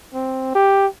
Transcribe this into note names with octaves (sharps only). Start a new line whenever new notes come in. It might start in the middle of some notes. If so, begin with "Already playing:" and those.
C4
G4